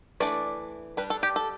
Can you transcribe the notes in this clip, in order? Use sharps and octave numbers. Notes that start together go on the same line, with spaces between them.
E3 A3 D4 D5
G3 D4 B4
A4
G4
A4